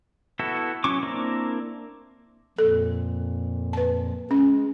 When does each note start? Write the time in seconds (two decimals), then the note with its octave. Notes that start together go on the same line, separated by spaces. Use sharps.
0.39 B3 E4 F#4 A4
0.84 F#3 C#4 E4 C#6 D6
1.03 A#3 C4 D4 E4 A#4
2.58 F2 A#2 A4
3.73 B4 A5
4.31 G#3 C#4